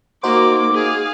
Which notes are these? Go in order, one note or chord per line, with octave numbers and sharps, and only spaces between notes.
A#3 D#4 F#4 C5 D6
G#4 F5